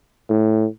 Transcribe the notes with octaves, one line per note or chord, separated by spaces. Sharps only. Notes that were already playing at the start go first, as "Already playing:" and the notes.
A2